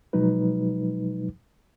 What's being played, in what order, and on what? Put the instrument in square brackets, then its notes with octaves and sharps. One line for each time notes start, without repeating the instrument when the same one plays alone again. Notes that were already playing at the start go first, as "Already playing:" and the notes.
[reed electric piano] B2 F3 F#3 G#3 D#4 B4